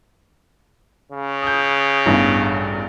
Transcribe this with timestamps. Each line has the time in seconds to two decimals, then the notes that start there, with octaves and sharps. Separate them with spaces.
1.12 C#3
1.43 D#6 G6
2.06 A1 E2 G2